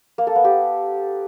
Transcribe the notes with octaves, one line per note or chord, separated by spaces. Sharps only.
A#3
A4
B3
G4